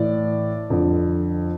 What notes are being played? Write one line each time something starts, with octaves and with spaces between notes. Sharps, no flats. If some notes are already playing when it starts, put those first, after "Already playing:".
Already playing: A2 E3 D5
F2 D3